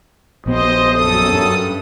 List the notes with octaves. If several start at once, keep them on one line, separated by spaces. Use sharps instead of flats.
A#1 B3 C5 D#5
F#2 A4 D#6
G2